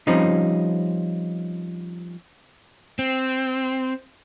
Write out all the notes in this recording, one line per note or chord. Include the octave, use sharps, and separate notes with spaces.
F3 G3 C4 C#4 D#4
C4